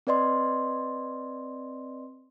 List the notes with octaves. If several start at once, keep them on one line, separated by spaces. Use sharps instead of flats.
C4 B4 D5 D#5 C6